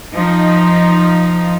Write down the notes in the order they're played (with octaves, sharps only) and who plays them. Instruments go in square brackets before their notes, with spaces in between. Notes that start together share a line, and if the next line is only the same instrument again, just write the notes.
[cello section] F3 D#4